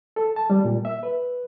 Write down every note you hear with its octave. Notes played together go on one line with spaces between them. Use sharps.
A4
A5
G3
A#2
E5
B4